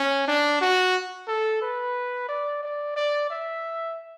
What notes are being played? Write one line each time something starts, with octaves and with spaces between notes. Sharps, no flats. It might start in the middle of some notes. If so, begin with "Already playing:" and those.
Already playing: C#4
D4
F#4
A4
B4
D5
D5
D5
E5